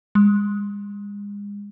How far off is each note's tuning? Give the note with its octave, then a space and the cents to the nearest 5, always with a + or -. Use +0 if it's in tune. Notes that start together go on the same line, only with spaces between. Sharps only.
G#3 -35